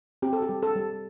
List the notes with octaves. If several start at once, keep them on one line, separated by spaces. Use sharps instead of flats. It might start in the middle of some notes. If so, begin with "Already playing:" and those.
C4 G4
A4
G4
G3
A4
G3